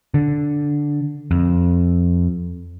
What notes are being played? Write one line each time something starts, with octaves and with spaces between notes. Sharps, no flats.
D3
F2